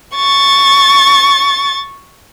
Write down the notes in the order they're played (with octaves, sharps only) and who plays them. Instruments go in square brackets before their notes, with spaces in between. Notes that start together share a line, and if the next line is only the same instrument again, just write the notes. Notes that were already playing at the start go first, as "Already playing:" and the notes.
[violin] C#6 A6